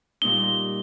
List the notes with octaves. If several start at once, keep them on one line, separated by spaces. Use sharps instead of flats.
A#2 G3 A#3 D#4 G7